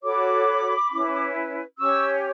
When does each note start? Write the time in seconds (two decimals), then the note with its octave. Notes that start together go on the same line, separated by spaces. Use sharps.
0.03 F#4 A4 C#5 B5 D6
0.90 C#4 E4 B4
1.78 C#4 G4 C#5 C#6 E6